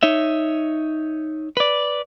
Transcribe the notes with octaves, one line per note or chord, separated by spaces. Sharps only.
D#4 C#5 E5
B4 D5